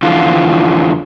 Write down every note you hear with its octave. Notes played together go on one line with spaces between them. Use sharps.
F2 D3 E3 F4